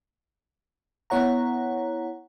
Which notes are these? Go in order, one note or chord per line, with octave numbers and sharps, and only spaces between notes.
B3 E4 C#5 F#5 A#5